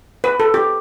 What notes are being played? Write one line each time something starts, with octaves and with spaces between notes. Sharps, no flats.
B4
A4
G4